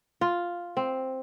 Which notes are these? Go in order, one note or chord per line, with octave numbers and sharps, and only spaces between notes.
F4
C4